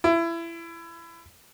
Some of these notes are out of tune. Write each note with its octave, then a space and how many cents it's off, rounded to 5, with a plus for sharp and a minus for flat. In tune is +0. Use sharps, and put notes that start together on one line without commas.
E4 +25